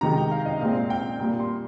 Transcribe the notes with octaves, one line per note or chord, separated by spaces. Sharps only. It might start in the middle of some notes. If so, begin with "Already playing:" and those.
C3 D#3 G#3 A#5
G5
F5
D#5
A#2 G#3 C4 F5
G5
A#2 G3 A#3
C6